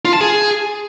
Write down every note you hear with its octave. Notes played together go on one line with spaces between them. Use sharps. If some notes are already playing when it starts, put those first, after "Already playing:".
F4
A5
G#4